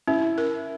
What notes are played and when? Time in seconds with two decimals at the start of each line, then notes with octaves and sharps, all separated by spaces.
0.07 C#4 E4
0.38 A#4